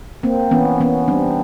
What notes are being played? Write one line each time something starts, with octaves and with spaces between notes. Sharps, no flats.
A#3 C4
E3 B3 C#4
E3 B3 C#4
G3 C4 D4